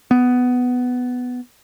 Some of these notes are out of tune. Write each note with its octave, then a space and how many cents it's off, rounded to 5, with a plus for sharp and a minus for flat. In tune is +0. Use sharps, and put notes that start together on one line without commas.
B3 +10